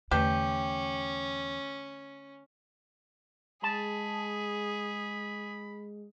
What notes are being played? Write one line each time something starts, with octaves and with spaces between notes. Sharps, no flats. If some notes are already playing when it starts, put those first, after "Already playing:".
E2 D3 A3 C#4 G4 B4
G#3 G#4 A5 B5